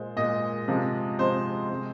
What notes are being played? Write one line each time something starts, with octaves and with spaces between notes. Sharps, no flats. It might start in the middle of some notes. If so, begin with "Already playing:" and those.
Already playing: A#2 G#3 C5
A#2 G#3 D#5
C3 F3 G#3
C3 F3 G#3 C5
C3 G#3